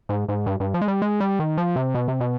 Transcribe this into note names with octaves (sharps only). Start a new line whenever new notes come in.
G#2
G#2
G2
G2
F3
G#3
G3
G#3
G3
D#3
F3
C3
B2
C3
B2